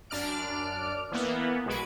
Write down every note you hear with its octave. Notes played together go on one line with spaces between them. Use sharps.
F#2 D4 D5 F6 D7
E3 A#3 B3
B1 G#3 F#4 B4 G#6 D7